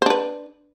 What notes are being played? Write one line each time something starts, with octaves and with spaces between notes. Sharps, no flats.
D4 B4 C5